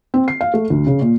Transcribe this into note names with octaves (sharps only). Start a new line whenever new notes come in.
C4
C7
F5
A3
D2
C#3
A#2